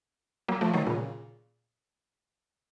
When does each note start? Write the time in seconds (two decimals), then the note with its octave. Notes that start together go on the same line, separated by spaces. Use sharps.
0.48 F#3 A#3
0.61 F3 A3
0.74 D#3 F#3
0.87 A#2 C#3